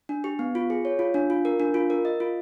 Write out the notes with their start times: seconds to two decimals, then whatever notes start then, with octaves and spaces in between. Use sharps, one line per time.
0.09 D4
0.24 G4
0.39 B3
0.55 F4
0.70 G#4
0.85 C#5
0.99 F4
1.14 D4
1.30 F4
1.45 A#4
1.60 D4
1.74 F4
1.90 A#4
2.05 D#5
2.20 F4